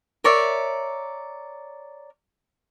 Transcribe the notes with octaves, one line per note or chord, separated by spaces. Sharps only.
A#4 C#5 D5 E5